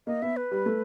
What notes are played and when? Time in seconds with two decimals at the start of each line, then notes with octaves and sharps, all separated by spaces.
0.07 A#3 D#5
0.22 B3 E5
0.37 B4
0.51 G3
0.66 A3